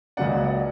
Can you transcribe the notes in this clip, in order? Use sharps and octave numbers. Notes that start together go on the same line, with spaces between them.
C#2 C#3 F#3 A#3 D5 F#5
D5 F#5